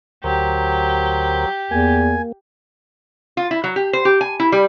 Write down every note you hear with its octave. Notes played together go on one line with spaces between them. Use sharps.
D2 F#3 G4 A#4 C5
E2 A#3 G#5
F4
E4
F#3
G4
C5
G4
G#5
E4
G3